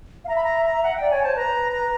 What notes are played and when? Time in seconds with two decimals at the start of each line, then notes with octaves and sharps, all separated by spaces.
0.25 F5
0.28 E5 A#5
0.36 B5
0.44 A#5
0.65 A#5
0.83 F#5
0.97 D5 G5
1.10 C#5 G#5
1.23 C5 A5
1.37 B4 A#5
1.72 A#5